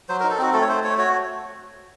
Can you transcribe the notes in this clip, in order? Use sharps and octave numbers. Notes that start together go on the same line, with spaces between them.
F#3 C5
A#4
D#4
A4
C4 F#4
A3 A4
C#5
A3 C5
A3 C#5
F#4 C#5